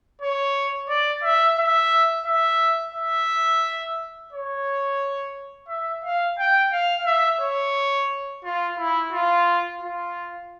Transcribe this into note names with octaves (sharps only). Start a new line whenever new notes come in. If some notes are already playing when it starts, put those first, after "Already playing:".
C#5
D5
E5
E5
E5
E5
C#5
E5
F5
G5
F5
E5
C#5
F4
E4
F4
F4